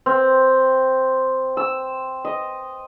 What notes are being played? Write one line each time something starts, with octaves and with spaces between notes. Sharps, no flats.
C4
E6
D#5